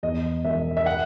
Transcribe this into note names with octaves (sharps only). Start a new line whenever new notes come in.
E2 D#5
E1 E5
E5
F#5